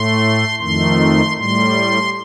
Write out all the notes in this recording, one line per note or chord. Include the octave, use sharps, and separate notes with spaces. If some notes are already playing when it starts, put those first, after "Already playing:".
Already playing: A2 A3 C6
F2 D#3 A3 C6
A2 G3 C6